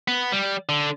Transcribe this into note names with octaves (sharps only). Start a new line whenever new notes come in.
B3
G3
D3